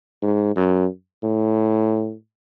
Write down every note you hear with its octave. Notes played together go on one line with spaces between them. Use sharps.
G#2
F#2
A2